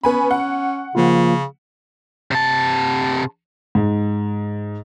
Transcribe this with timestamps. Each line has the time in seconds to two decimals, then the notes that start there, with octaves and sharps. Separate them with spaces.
0.04 B3 C#4 G#5 B5
0.31 F#5
0.95 C#3 F3 A#3 F4
2.31 C3 A5
3.75 G#2